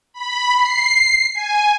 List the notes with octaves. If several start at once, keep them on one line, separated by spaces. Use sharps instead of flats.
B5
C7
G#5